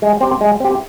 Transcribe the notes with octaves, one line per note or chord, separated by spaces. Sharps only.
G#3
C4 G4
G#3
C4 G4